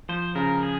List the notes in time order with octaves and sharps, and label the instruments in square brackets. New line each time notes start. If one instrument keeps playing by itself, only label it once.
[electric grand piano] F3 [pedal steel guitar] C5
[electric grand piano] C#3 [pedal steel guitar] A#4
[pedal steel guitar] G#4